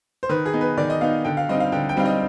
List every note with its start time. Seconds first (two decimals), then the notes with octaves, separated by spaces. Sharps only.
0.23 C5
0.29 D#3 B4
0.46 G#4
0.53 B3 D#4
0.61 B4
0.78 D#3 D5
0.90 D#5
1.01 B3 D#4 F5
1.25 D3 G5
1.37 F5
1.49 G3 C4 D#4 D#5
1.60 F5
1.72 D3 G5
1.89 G5
1.97 G3 C4 D#4 F5
2.05 D#5